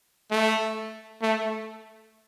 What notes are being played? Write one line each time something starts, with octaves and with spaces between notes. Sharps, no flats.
A3
A3